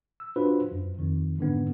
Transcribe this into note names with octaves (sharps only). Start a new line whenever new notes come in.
E6
D4 F4 F#4 B4 C5
F#2
F2 D#3
G#2 D3 B3